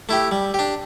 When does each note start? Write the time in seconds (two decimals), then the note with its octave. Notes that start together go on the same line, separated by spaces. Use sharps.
0.09 A3 E4 G4
0.31 G3
0.54 D4 G4